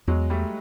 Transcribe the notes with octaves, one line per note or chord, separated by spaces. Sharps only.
E2 F#3 G#3
G3 A3